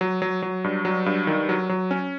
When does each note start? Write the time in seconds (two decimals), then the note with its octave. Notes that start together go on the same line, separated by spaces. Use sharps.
0.01 F#3
0.22 F#3
0.42 F#3
0.64 G2
0.85 F#3
1.06 G2
1.27 D#3
1.49 F#3
1.69 F#3
1.91 C#4